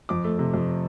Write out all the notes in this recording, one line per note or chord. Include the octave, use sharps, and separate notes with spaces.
F2 D6
A3
C3
F2